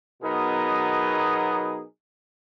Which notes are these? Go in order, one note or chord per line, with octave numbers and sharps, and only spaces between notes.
B2 F#3 B3 D#4 G#4 A#4